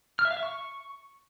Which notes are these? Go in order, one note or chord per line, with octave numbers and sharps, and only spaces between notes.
F6
E5
F5
E5
C#6